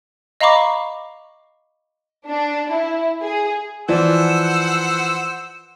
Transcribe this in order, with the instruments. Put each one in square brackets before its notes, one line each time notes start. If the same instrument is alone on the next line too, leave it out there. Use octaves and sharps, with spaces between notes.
[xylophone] D#5 F5 A#5 B5 C#6 D6
[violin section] D4
E4
G#4
[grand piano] E3 F3 D5 [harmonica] C5 F#5 E6